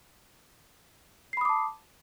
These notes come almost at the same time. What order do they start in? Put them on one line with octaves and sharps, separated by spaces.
C7 B5 D#6 D6 A5